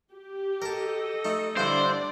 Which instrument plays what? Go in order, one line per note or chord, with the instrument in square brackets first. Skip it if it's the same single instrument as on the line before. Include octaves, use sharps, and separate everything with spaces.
[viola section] G4
[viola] A4 D#5 [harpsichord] A#4 A5
[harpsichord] A3 D#4
[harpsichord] G2 D3 E4 [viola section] D4 D5 [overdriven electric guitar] C5